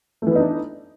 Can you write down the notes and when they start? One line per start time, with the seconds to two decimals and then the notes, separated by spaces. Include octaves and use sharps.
0.22 A3
0.27 E3
0.31 B3
0.36 D#4
0.40 D4